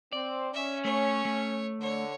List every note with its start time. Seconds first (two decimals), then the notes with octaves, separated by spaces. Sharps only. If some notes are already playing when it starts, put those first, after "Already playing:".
0.12 C4 D5
0.53 C#4 E5
0.85 A3 C#5
1.25 A3
1.80 D3 C#5